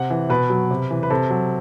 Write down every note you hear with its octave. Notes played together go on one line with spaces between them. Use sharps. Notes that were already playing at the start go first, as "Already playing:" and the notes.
Already playing: C3 F#5
E3
B2 B4
F#3
C3
E3
B4
C3 A4
F#3